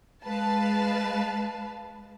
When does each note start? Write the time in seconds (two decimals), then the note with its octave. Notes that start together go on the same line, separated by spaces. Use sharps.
0.23 G#3 B4 F5 A5